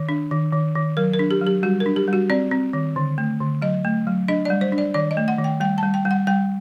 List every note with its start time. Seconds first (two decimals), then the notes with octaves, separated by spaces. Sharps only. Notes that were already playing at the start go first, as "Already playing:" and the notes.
Already playing: D#3
0.09 D4
0.31 D#3
0.53 D#3
0.75 D#3
0.97 F#3 A#4
1.14 A#4
1.19 D4
1.31 G4
1.41 F#3
1.47 G4
1.63 G3 F#4
1.80 A#4
1.86 D4
1.96 G4
2.07 G3
2.13 F#4
2.30 C4 D5
2.51 C4
2.73 D#3
2.96 D3
3.18 A3
3.40 D3
3.62 F#3 D#5
3.84 A3
4.07 F#3
4.28 D4 D#5
4.45 G3 D5
4.61 C5
4.72 D4
4.78 D5
4.94 D#3 D5
5.11 D#5
5.17 A3
5.28 F#5
5.39 D#3
5.44 G5
5.60 G3 G5
5.78 A5
5.83 G3
5.94 G5
6.05 G3
6.11 F#5
6.27 G3 G5